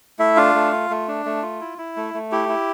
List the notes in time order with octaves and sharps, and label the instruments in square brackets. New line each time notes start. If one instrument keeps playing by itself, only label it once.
[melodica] A3 E4 E5
D4 F4 F5
A3
F4
A3
D4
A3
F4
E4
E4
A3
A3
E4 G4
E4